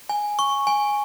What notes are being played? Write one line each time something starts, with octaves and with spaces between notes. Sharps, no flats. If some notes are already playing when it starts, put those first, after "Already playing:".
G#5
C#6
G#5